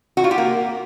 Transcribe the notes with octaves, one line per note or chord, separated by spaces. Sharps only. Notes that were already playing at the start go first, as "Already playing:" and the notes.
F#4
F4
G4
A#3